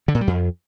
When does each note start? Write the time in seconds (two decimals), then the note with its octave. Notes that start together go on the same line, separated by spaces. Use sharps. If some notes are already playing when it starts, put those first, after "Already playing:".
0.08 D3
0.15 A#2
0.21 G3
0.27 F2